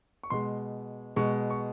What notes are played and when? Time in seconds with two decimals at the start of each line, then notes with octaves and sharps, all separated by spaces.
0.23 C#6
0.30 B2 G#3 C6
1.16 B2 G#3 C#6
1.50 C#6